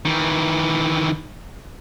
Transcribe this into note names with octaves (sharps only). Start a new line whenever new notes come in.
D#3 E3